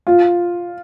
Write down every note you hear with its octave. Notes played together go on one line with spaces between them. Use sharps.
F4